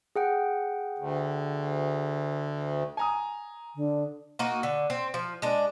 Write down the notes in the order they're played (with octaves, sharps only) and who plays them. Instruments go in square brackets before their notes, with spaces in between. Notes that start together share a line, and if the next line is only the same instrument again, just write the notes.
[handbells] G#4 F#5 G5
[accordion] D2
[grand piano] G#5 A#5 D#6
[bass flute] D3
[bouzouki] A#3 D#4 F#4
D3
C4
F3
G#3 D4